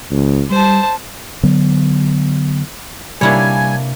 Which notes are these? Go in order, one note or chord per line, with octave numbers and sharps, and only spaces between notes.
C#2
G3 C5 A5
D3 F#3 B3
C3 G3 A#3 D4 E4 C#5 G#5